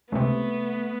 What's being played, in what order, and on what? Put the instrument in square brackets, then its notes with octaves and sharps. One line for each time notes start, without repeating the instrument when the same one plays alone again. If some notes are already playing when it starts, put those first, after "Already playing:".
[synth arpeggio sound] C#2 C3 [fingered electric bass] A3 [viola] B3